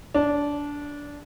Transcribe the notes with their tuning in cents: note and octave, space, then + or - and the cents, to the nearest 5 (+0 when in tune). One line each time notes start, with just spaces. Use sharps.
D4 -15